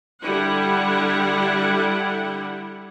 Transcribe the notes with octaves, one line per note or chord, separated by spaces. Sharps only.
D3 G3 E4 F#5